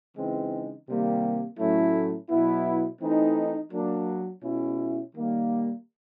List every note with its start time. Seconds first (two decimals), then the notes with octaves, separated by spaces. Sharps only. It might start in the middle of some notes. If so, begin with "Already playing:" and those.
0.16 C#3 E3 G#3 C4 D#4
0.87 C3 D#3 G3 A#3
1.58 A2 F#3 A3 C#4 E4
2.30 B2 F#3 B3 E4
3.00 E3 A3 C4 D#4
3.71 F#3 A#3 D4
4.43 B2 G#3 C#4 E4
5.14 D#3 G3 A#3